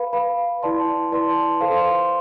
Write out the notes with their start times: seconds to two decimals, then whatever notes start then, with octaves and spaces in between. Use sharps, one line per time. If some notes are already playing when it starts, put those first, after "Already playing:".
Already playing: B4 F5 B5
0.13 B4 F5 B5
0.63 E4 B4 D5 A5 C6
1.12 E4 B4 D5 A5 C6
1.61 A4 C5 F5 C6